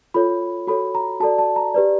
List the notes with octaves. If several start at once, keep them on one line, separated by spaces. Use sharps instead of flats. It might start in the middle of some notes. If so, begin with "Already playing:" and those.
F4 A4 C#5 B5
F#4 A4 C#5 B5
A#5
F#4 A4 D5 A5
A5
A#5
G4 B4 D5